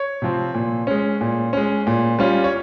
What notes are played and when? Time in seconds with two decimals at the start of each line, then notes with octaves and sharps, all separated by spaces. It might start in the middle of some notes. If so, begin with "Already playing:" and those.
Already playing: C#5
0.22 C3 F3 C4
0.54 A#2
0.87 G#3 C#4
1.21 A#2
1.53 G#3 C#4
1.87 A#2
2.19 G3 C#4 F4
2.44 C#5